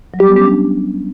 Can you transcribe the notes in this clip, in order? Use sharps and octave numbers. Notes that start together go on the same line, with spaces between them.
F#3
G3 G4
B3
C#4 G4
D4